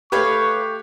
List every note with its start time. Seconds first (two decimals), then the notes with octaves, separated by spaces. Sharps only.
0.12 A3 G4 B4 C#5 F5 C#6